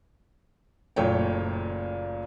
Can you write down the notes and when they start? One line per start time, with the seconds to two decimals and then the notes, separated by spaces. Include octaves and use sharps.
0.96 F#1 A#2 A3 C#5 G5